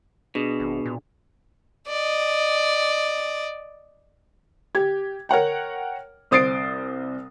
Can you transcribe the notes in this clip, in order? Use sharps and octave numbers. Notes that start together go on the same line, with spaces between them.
B2 D4 G#4
G#1
A#2
D5 D#5
G4 G#6
A#4 C#5 F#5 G5
C2 C5 D#6 A6 C7 D7